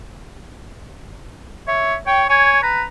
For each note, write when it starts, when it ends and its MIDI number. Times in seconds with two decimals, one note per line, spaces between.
1.68 1.94 73
1.68 1.99 76
2.07 2.27 73
2.07 2.23 79
2.30 2.61 73
2.30 2.58 80
2.63 2.83 71
2.63 2.85 82